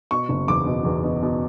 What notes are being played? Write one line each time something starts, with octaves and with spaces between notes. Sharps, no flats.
B2 C#6
F#1
E2 D6
B2
E2
B2
B2